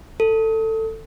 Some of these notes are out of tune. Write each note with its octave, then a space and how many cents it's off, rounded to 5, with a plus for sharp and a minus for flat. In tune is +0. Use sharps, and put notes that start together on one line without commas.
A4 +15